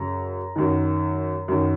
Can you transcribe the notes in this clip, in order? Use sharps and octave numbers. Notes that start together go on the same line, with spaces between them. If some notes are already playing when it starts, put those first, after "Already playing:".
Already playing: F#2 C#3 A#5
F#2 D#3
F#2 D#3